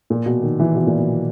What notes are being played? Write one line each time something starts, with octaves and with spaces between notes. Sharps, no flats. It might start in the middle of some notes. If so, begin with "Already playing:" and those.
A#2
B2
D#3
E3
B2
A#2
B2